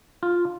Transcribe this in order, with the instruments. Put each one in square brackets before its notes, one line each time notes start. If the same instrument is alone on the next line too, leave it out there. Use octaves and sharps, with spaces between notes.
[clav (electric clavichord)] F4